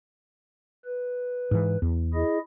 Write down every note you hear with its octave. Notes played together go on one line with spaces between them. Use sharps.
B4
G#2 E3
E2
E4 G#4 D#5